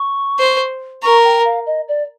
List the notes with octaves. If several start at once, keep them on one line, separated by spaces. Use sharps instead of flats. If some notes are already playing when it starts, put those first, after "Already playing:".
Already playing: C#6
C5
A#4 C#6
G5
F5
D#5
D5